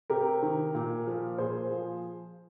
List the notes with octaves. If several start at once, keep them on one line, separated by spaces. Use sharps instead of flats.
C3 G4 A#4
D#3
A#2
F3
A#2 G#4 C5
F3